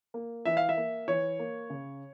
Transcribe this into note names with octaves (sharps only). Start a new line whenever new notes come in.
A#3
E3 E5
F5
E5
A#3
E3 C#5
A#3
C#3